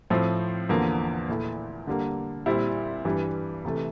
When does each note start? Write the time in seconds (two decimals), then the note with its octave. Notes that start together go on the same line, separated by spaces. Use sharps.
0.10 A2 F3 C4
0.69 E2 D3 F3 A#3
1.28 A#2 A3 E4
1.87 D3 G3 A#3
2.46 A#2 G3 C4 E4
3.05 G2 E3 G3
3.65 C3 E3 A3